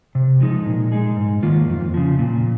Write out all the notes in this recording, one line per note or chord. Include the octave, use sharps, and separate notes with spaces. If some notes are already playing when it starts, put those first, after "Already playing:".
C3
F3 G#3 D#4
A#2
G#3 D#4 G#4
G#2
D#3 A#3 F4
F2
C#3 F3
A#2